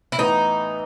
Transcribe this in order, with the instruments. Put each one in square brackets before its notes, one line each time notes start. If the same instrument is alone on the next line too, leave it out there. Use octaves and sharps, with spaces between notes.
[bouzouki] E4
[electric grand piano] A2 E3 B3 [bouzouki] D#4